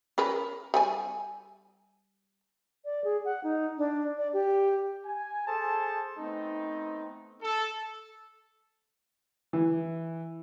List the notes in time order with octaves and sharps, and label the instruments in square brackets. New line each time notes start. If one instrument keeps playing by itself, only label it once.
[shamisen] C#4 A#4 B4
G3 G5 G#5
[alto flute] D5
G#4
F#5
D#4
D4
D5
G4
[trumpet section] G#5
G#4 A4 C5 A5
A3 B3 C4 D#4
A4
[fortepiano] E3